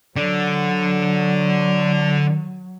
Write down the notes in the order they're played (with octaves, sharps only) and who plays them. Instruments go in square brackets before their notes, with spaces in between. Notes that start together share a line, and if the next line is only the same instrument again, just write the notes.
[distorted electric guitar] D3 [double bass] F#3